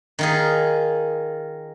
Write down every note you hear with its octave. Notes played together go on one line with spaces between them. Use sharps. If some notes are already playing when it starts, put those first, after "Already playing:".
D#3 F4 G#4